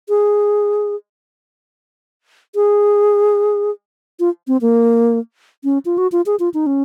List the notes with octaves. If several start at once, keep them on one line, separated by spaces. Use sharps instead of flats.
G#4
G#4
F4
C4
A#3
C#4
F4
F#4
F4
G#4
F4
D#4
C#4